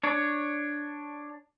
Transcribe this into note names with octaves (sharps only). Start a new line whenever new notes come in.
D4 C#5